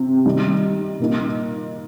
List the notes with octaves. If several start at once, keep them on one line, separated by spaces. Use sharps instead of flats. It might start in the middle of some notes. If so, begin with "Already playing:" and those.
Already playing: C3 C4
D#3 G3 D#4
A#2 A#3 D#4